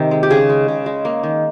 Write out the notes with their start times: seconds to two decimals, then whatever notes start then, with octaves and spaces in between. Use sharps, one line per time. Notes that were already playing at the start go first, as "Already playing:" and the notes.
Already playing: C3 D#3
0.11 G#3
0.23 G4
0.30 C#3 G#4
0.49 G#3
0.68 C#3
0.86 G#3
1.05 A#3
1.23 D#3